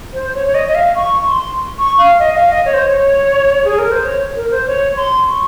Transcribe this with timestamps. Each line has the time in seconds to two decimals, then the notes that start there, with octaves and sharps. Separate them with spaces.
0.14 C5
0.35 C#5
0.47 C#5
0.55 D#5
0.68 D#5
0.75 F5
0.96 C#6
1.27 C6
1.78 C#6
1.98 F5
2.20 D#5
2.35 F5
2.50 D#5
2.65 C#5
2.74 C5
2.82 C#5
3.64 G#4
3.78 A#4
3.91 C5
4.05 C#5
4.36 A#4
4.51 C5
4.67 C#5
4.97 C6
5.28 C#6